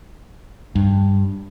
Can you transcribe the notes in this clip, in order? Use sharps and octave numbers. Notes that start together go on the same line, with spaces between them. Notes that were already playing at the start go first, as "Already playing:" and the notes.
G2